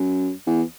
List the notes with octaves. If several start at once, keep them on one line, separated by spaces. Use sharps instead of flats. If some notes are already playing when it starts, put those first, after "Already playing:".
Already playing: F#2
E2